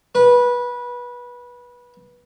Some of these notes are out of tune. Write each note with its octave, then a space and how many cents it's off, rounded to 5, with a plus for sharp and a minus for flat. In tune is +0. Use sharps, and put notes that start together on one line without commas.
B4 -20